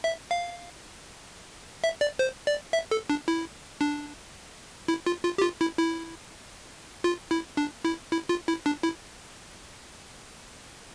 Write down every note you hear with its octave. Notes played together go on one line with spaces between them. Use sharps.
E5
F5
E5
D5
C5
D5
E5
A4
D4
E4
D4
E4
F4
F4
G4
F4
E4
E4
F4
E4
D4
E4
E4
F4
E4
D4
E4